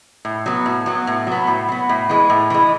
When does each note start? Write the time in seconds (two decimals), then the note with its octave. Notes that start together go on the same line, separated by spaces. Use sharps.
0.25 A2
0.46 F#3 B3
0.66 A2
0.86 F#3 B3
1.07 A2
1.27 F#3 B3
1.47 A2
1.69 F#3 B3
1.89 A2
2.09 E3 G#3
2.30 A2
2.50 E3 G#3